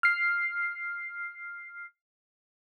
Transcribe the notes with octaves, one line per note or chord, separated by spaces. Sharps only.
F6 C7